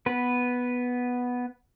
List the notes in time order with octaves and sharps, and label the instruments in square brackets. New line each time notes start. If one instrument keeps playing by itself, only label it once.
[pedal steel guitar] B3 B4